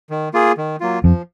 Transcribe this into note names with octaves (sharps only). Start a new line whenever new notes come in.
D#3
A#3 F4 G#4
D#3
F#3 A#3 F4
F2 F3